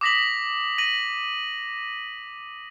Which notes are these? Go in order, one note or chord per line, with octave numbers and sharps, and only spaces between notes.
D6 D#6 A#6 B6 F#7
A#6 D#7 F#7